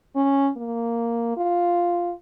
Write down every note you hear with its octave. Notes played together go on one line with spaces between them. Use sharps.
C#4
A#3
F4